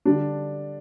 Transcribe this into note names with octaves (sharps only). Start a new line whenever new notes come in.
D3 G3 D4